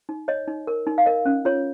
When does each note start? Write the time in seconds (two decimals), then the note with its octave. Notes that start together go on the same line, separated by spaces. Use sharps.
0.09 D#4
0.28 C#5 D#5
0.48 D#4
0.67 A#4
0.87 D#4
0.98 F5
1.06 A#4 D#5
1.25 C#4
1.45 F4 C#5